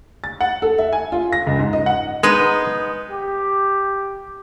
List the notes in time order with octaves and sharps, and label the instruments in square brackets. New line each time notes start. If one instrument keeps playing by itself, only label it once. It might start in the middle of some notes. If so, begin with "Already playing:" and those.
[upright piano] A6
F#5
A4
E5
G#5
F4
A#6
C#2
G#2
D#5
F#5
[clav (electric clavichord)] G#3 [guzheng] B3 D#4
[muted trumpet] G4